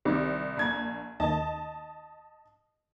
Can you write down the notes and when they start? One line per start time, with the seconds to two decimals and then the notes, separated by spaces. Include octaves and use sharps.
0.05 C2 D#3 C4 G4
0.57 A#1 G#6
1.20 D#2 D#3 D#5 A5